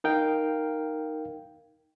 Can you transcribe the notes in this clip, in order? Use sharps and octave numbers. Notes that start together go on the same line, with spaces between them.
D#4 A#4 F5 G5